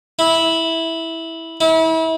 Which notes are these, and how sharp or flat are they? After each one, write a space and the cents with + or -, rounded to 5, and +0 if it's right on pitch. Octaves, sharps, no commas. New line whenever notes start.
E4 -10
E4 -35